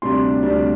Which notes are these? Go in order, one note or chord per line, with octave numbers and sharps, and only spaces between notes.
D2 C3 G3 D4 C6
D2 C3 G3 D4